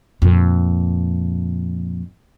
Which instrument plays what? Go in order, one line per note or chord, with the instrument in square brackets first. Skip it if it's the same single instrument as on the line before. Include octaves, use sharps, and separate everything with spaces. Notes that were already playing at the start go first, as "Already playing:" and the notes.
[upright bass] F2 A#2